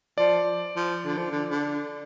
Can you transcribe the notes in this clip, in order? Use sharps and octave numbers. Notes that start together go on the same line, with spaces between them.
F3 D5
F3
D3
F3
D3
D3